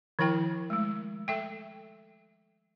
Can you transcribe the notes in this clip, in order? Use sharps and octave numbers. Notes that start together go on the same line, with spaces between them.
D#3 F3 E4 A#4 G5
G#3 A3
A4 E5 G5